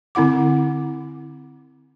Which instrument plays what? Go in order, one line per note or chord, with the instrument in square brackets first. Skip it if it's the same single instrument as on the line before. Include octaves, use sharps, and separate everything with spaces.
[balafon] D3 C4 E4 F#5 D6